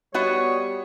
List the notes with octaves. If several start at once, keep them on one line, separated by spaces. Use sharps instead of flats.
G3 B3 F#4 C#5 D#5